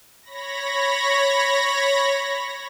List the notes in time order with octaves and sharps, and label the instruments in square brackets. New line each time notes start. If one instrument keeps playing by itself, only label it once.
[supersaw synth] C#5 B5 A#6